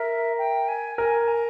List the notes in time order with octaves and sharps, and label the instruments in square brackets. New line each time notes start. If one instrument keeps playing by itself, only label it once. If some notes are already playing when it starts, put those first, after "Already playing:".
Already playing: [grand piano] A#4 [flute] E5
[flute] G5
G#5
[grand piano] A#4 [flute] G#5
[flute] A#5